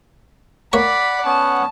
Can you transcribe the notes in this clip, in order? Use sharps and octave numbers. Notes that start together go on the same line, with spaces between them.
A#3 C#5 D5 F#5 B5 C#6
B3 C#4 A5